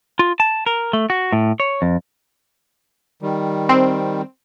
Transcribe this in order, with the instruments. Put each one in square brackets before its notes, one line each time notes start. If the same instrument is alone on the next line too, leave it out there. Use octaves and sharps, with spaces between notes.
[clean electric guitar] F4
A5
A#4
A3
F#4
A2
C#5
F2
[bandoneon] D#3 G3
[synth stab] C4